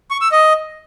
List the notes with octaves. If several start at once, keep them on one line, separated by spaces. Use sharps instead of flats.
C#6
E6
D#5